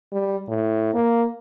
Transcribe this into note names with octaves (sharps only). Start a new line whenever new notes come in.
G3
A2
A#3